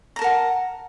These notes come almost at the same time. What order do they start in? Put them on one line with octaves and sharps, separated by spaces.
A#5 A5 A#4 F#5